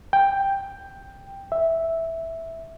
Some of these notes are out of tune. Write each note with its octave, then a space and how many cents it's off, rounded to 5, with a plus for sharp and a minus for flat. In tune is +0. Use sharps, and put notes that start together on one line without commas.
G5 +5
E5 -5